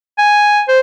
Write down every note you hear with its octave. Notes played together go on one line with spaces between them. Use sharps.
G#5
C5